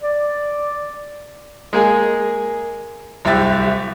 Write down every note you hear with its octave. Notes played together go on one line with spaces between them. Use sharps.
D5
G#3 A#3 G#4
D1 C2 G4 E5 A6